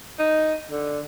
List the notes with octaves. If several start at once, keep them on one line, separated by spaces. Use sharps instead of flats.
D#4
D3